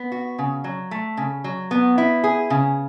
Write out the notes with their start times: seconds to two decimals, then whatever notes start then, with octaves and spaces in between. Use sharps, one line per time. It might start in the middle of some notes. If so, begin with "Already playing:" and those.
Already playing: B3
0.12 F#4
0.39 C#3
0.64 F#3
0.91 A3
1.17 C#3
1.44 F#3
1.71 B3
1.98 E4
2.24 G#4
2.50 C#3